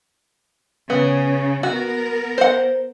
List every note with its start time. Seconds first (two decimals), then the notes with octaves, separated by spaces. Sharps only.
0.90 C#3 B3
1.63 B3 F#4 A#4
2.38 C5 F#5